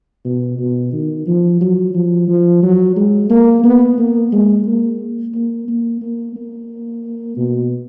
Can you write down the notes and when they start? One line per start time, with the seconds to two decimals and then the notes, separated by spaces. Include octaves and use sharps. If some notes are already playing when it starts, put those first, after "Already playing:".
0.25 B2
0.59 B2
0.93 D#3
1.27 F3
1.61 F#3
1.95 F3
2.28 F3
2.63 F#3
2.96 G#3
3.30 A#3
3.64 B3
3.98 A#3
4.32 G#3
4.66 A#3
5.34 A#3
5.68 A#3
6.02 A#3
6.36 A#3
7.37 B2